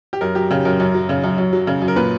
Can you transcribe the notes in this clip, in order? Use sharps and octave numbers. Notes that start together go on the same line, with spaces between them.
G4
F#2 A#4
F#3 G4
C#3 G4
F#2 A#4
F#2
F#3
C#3
F#2
F#2
F#3
C#3
F#2
A#4
A#2 B4